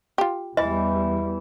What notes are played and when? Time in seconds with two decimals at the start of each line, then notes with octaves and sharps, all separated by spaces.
0.18 F4 G4
0.57 E2 E3 G3 D#5